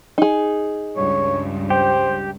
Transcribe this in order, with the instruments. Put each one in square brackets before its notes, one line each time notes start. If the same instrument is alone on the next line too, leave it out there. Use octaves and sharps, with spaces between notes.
[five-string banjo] D#4 G#4
[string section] C#2 G2 [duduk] C#5
[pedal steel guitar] G4 [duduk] C5